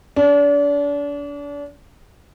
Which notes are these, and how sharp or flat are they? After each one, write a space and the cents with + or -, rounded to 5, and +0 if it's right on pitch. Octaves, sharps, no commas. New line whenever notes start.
D4 -35